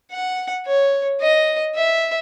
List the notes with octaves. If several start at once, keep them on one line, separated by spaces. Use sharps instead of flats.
F#5
C#5
D#5
E5